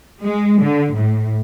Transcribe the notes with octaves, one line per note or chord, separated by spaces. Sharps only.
G#3
D3
A2